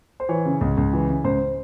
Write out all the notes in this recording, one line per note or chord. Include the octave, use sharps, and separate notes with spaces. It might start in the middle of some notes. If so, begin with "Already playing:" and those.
C5
E3 C#5
C#3
C#2
C#2
E3
C#3
C#2 C5